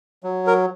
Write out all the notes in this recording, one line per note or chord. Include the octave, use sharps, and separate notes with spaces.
F#3
A#4